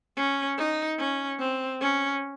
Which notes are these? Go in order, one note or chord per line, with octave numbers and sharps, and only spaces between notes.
C#4
D#4
C#4
C4
C#4